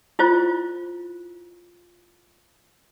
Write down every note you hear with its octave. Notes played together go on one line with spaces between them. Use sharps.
E4 F4 C5